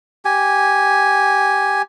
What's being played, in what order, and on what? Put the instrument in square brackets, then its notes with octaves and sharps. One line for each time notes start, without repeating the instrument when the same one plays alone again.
[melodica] G4 G#5